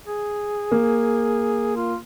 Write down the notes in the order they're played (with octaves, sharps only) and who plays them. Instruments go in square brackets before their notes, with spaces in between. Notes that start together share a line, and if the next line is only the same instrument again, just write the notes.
[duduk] G#4
[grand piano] A#3
[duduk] F4